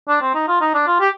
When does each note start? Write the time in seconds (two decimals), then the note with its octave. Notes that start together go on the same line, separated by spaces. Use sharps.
0.08 D4
0.21 C4
0.35 D#4
0.48 F4
0.61 D#4
0.74 D4
0.87 F4
1.00 G4